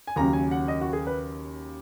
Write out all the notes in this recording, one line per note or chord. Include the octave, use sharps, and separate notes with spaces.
G#5
D#2 C#3 F#3 A#5
G#5
F#5
D#5
F#4
G#4
B4